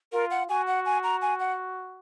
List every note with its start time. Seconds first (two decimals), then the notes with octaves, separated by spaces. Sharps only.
0.13 F4 A#4
0.31 F#5
0.49 F#4 G#5
0.67 F#5
0.86 G#5
1.04 A#5
1.22 G#5
1.40 F#5